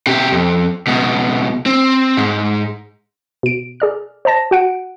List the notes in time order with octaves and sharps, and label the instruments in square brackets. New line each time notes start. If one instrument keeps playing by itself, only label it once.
[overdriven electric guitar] B2 G4
F2
C#2 B2
C4
G#2
[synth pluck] B2 D7
G#4 D5 F6
C5 D#5 A5 A#6
F#4 F#5 D7